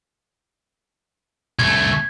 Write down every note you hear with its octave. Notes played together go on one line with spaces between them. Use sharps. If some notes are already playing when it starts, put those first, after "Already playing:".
C2 A3 G#6